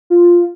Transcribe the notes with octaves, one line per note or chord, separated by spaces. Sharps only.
F4